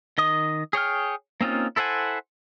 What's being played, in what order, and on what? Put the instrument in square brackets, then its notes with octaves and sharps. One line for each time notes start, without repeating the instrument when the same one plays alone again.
[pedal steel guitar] D#3 D#5 D#6
G#4 C#5 G5 F6
A#3 C4 C#4 D#4 F4
E4 A4 C5 F#5 G#5